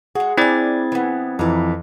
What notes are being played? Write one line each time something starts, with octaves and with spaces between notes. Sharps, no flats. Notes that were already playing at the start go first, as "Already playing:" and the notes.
G#3 F#4 G#4
C4 D4 E4 G#5 G#6 A6
E3 B3
F2 E3 B4 A#5